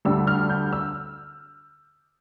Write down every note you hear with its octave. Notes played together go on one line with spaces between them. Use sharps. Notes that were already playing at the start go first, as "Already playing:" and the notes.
D2 D3 G3 E6
F6
G6
E6